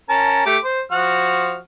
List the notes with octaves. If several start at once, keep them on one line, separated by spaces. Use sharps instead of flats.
C#4 A#4 A5
A3 G4 D6
C5
F3 F#4 F6